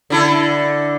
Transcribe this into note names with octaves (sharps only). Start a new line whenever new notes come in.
D3 E4 A4